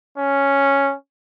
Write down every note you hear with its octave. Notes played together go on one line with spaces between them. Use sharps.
C#4